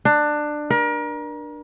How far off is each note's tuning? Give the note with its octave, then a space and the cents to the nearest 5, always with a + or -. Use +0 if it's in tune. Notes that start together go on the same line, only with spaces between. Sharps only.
D4 +20
A#4 +35